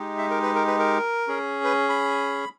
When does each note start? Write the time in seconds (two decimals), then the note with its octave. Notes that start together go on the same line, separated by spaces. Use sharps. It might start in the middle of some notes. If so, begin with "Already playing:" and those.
Already playing: G#3 D#4 G4
0.18 E5
0.30 A#4
0.43 B4
0.55 A#4
0.67 B4
0.79 A#4
1.28 C#4 G#4
1.64 B4
1.89 B5